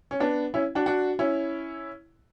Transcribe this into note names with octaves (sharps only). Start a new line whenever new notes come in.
C#4
B3 D4
C#4 E4
D4 F#4
D4 F#4
C#4 E4